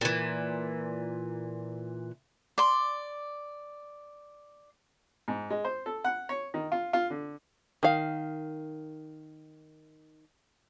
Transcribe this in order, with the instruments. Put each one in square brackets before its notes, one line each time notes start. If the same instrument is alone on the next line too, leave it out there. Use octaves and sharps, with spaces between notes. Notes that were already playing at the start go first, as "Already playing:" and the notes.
[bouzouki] A#2 E3
[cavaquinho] D5 C6
[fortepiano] G#2
G#3
C5
A4
F#5
C#5
D#3
F4
F4
D3
[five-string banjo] D#3 F5